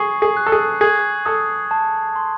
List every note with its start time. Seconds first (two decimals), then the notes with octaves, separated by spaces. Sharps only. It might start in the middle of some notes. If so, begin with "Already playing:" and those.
Already playing: G#4 C#6 C7
0.22 G#4
0.37 F#6
0.46 A4
0.52 G#4
0.81 G#4 G#6
1.26 A4 D#6
1.71 A5
2.16 C6